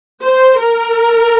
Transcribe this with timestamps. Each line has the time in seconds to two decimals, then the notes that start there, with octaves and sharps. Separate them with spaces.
0.22 C5
0.59 A#4